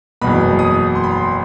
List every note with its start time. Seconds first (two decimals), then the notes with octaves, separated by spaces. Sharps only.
0.22 F#1 E2 B2 B5
0.59 D#6
0.95 C6
1.04 B5
1.11 C6